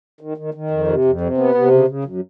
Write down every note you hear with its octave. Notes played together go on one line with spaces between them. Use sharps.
D#3
D#3
D#3
F2
C3
F2
C3
B3
C3
C#3
C#3
F#2